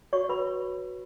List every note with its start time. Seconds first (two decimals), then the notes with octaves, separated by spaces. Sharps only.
0.13 F#4 C#5 C#6
0.29 B4 B5